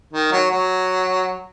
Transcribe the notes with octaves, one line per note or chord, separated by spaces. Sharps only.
D#3
F#3
F#3